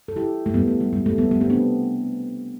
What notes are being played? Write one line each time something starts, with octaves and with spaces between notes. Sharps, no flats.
A4
E4 G4
A3
G3 B3
A3
G3
G3
A3
G3 B3
G3 B3
A3 C4
B3 D4